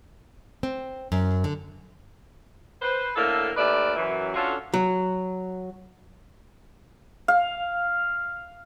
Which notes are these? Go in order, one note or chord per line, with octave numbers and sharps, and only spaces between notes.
C4
F#2
D3
B4 C5
A2 D3 A#3 A4 E5 F5
D#2 A3 B4 D5
F#2 E3
C#4 D4 F4 F#4 A4
F#3
F5